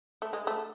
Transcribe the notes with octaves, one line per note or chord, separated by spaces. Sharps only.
A3
G#3
A3